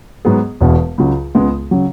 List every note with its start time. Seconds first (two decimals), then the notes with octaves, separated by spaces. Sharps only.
0.25 G#2 F#3 B3 G#4
0.61 E1 E2 B2
0.98 C#2 C#3 F#3
1.35 C#2 C#3 G#3 B3
1.71 C#3 F#3